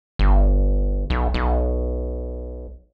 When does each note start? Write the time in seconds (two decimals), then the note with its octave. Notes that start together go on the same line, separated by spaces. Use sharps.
0.19 G1
1.10 B1
1.34 B1